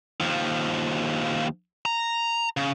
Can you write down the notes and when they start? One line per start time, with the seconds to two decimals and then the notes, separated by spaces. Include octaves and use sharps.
0.20 D#2 F3
1.85 A#5
2.57 C#3